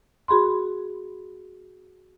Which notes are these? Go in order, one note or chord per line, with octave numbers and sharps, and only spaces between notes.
F#4 G#4 B5 C6